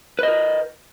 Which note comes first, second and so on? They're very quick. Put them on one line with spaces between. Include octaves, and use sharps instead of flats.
B4 D#5 A#4